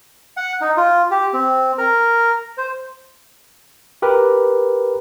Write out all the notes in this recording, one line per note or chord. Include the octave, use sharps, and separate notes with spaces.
F#5
D#4
F4
G4
C4
A#4
C5
G4 A#4 B4